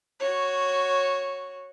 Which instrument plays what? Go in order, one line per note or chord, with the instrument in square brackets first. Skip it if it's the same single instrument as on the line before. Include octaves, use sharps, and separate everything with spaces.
[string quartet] F#4 C#5